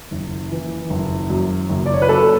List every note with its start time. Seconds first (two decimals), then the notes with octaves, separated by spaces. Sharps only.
0.11 F#1
0.51 E3
0.90 F#1
1.30 F#2
1.69 F#1
1.86 D5
1.94 C#5
2.02 B4
2.09 F#3 A4